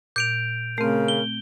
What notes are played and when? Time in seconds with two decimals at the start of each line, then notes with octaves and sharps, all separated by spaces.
0.16 A#2 G6 D7 F7
0.78 C#3 A3 C4 A#4
1.08 G7